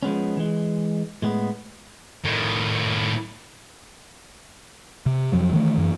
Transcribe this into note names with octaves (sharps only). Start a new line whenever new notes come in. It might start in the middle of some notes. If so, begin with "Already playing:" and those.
F3 G#3 B3 C#4
E3 G#3
A2 G#3 B3
A2 D#3
C3
F2 F3 F#3
D#3 E3 A3
F#2 E3